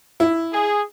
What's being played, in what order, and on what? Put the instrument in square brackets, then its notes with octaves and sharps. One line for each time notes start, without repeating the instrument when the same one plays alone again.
[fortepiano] E4
[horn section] G#4